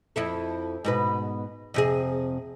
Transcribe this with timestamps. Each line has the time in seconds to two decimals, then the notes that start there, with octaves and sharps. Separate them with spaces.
0.16 F2 E4 A4
0.84 G#2 B2 B4
1.74 F2 C3 G#4